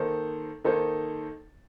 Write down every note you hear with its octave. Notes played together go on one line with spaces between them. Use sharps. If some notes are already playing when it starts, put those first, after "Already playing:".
Already playing: D#3 A#3 D#4 A4 C5
D#3 A#3 D#4 A4 C5